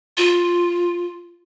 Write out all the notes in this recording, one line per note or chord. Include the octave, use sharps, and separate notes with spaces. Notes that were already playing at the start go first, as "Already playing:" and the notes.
F4